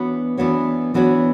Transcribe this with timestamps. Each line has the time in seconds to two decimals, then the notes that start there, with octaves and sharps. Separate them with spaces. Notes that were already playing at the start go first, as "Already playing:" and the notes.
Already playing: E3 B3 D4 F#4 C#5
0.37 E3 B3 D4 F#4 C#5
0.94 E3 B3 D4 F#4 C#5